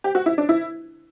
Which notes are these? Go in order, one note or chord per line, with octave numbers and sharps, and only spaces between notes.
G4
F#4
E4
D4
E4